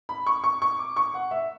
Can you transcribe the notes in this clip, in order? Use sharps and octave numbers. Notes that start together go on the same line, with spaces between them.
B5
C#6
C#6
C#6
D6
C#6
F#5
E5